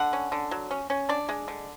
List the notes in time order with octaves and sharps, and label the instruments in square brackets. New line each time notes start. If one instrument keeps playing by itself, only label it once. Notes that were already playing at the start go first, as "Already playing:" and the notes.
Already playing: [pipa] D3 F#5
C#4
D3
F#3
C#4
C#4
D4 D5
G#3
D3